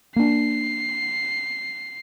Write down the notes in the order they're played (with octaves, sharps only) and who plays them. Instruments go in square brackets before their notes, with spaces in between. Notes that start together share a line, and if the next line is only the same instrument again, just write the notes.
[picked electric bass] A#3 D4 [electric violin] C7